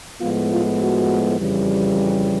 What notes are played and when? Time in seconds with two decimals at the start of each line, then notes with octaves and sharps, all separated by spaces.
0.21 A2 F3 G#3 B3 F4
0.51 F4
0.80 F#4
1.39 F2 C#3 E3 G3